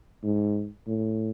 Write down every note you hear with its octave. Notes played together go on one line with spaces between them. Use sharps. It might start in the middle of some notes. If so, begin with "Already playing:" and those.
G#2
A2